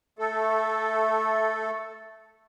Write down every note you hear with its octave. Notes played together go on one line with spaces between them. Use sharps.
A3 A4